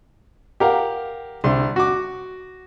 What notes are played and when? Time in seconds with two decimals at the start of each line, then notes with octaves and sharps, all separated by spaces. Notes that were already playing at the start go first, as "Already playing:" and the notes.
0.60 G4 A#4 F5 F#5
1.44 C2 D3 C6
1.76 F#4 D6